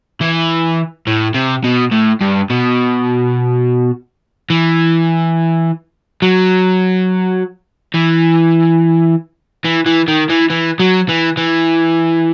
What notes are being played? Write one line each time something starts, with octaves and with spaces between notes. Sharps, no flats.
E3
A2
C3
B2
A2
G2
B2
E3
F#3
E3
E3
E3
D#3
E3
E3
F#3
E3
E3